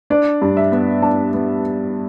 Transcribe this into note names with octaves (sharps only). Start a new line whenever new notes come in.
D4 D5
G2
E5
B3
D4 A5
B3